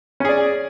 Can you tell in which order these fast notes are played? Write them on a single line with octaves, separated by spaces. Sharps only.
C#4 G#4 D5